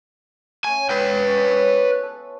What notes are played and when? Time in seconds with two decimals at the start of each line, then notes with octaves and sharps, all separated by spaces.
0.65 A3 C#4 G#5
0.89 G3 B3 B4 G5
1.27 C#4
1.47 F4 C#5 E6
2.03 A4